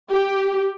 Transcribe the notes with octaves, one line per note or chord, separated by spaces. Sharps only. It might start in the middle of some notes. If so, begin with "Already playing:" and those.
G4